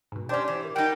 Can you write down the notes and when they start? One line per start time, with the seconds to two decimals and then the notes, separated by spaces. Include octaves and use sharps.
0.12 G#2 B2
0.29 C#4 D4 G4 C5 D5
0.48 E3
0.64 A#4
0.76 G3 D#4 F#5 G5 A6